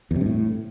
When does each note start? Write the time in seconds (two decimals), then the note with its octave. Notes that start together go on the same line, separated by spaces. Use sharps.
0.11 E2
0.16 C3
0.21 G2
0.26 A2